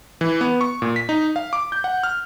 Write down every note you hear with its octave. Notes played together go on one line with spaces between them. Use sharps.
E3
B3
C#6
A#2
B6
D#4
F5
D6
G6
F#5
F6